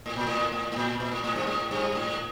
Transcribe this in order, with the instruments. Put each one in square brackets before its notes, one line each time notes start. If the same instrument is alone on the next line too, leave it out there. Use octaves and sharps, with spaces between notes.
[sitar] A2
A#2
A2
A2
A2
A#2
A#2
A2
A2
G2
A2
G2
A2